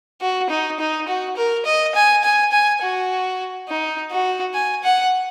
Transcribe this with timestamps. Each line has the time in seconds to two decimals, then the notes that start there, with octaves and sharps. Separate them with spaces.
0.21 F#4
0.50 D#4
0.79 D#4
1.08 F#4
1.36 A#4
1.66 D#5
1.95 G#5
2.24 G#5
2.52 G#5
2.81 F#4
3.68 D#4
4.11 F#4
4.54 G#5
4.84 F#5